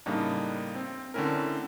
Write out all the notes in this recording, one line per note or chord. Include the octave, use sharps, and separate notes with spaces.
A2 C#3 G3 A#3 D4 D#4
C4
D3 A3 C4 C#4 E4 A#4